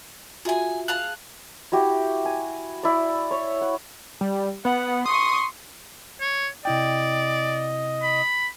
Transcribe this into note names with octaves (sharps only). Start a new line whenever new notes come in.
F4 F#4 G#4 E5 G#5
G#4 F5 A5 F#6
E4 F#4 G4
G#5
E4 D5
C#5
F#5
G3
B3 F#5
C6 C#6 D#6
C#5
C3 E4 D5 D#5 G5
B5